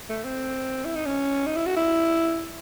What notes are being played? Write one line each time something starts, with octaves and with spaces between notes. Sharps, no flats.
A3
C4
E4
D#4
C#4
D#4
E4
F#4
E4